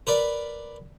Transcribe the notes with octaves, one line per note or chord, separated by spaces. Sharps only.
A#4 B4 D5 B5